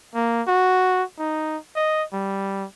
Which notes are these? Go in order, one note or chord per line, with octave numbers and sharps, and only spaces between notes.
A#3
F#4
D#4
D#5
G3